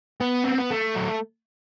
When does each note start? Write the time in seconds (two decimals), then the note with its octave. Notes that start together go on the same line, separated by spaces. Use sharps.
0.20 B3
0.44 C4
0.58 B3
0.71 A3
0.95 F#3